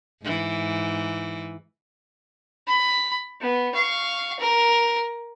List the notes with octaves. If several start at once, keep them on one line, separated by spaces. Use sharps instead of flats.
G#2 E3
B5
B3
F5 C#6
A#4